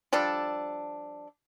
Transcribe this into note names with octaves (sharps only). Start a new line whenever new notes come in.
F3 G3 D4 A4